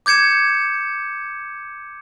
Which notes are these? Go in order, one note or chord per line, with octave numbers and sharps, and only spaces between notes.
D6 G6 G#6 C#7 E7